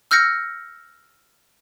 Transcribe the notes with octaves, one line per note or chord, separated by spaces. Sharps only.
E6 F6 G6 A#6 C#7